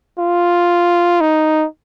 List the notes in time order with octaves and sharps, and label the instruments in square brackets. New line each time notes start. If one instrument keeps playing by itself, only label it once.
[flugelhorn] F4
D#4